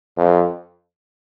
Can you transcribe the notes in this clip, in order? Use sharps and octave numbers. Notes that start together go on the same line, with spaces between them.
F2